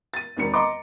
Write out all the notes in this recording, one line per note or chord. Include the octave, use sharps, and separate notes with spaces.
A6 D#7
E1 D#3 C4 D4 A#4 C#7
D#5 A#5 C6 D6